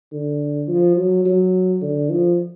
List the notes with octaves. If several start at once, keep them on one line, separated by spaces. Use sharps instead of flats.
D3
F3
F#3
F#3
D3
F3